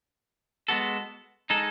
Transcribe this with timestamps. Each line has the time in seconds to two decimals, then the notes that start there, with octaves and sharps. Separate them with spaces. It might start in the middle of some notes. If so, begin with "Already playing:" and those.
0.68 G#3 B3 F#4 A4
1.50 G#3 D#4 A4